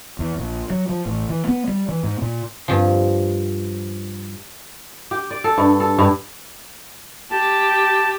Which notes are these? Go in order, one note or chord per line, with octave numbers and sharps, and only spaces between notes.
E2
A#1
F#3
F3
A1
E3
B3
G3
E3
G#2
A#2
G2 F3
G4
D5
A4
G2
A4
G2
G4 A5